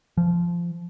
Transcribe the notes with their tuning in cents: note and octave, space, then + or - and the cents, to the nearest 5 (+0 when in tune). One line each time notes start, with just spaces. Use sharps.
F3 -15